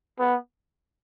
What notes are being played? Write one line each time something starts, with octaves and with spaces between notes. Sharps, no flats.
B3